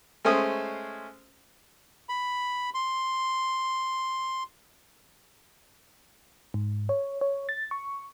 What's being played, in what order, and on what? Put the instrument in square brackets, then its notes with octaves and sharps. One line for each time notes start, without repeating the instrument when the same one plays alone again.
[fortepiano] G#3 A3 C#4 C5 D#6
[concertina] B5
C6
[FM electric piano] G#2
C#5
C#5
A6
C#6